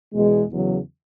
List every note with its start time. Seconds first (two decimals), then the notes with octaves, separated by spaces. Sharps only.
0.14 E2 B2 G#3
0.49 E2 C#3 F#3